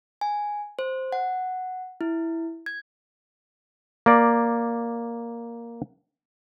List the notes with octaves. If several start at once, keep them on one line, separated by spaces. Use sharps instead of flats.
G#5
C5
F#5
E4
G#6
A#3 D5